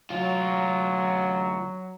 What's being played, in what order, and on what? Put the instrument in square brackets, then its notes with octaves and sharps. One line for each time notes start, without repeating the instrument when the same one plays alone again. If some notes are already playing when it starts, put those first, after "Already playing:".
[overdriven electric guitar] D2 F4 [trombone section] F#3